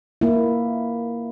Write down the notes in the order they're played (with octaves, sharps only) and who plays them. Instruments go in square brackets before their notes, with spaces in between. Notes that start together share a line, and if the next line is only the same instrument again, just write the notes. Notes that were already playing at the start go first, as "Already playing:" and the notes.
[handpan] A#3 E4